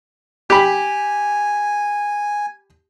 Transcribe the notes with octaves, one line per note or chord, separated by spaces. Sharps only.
G4 G#5 B5